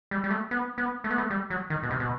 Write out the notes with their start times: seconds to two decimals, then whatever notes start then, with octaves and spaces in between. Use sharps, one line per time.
0.11 G3
0.24 G3
0.30 A3
0.51 B3
0.78 B3
1.04 A3
1.10 B3
1.18 A3
1.30 G3
1.50 F#3
1.70 D#3
1.83 B2
1.91 C3
2.00 B2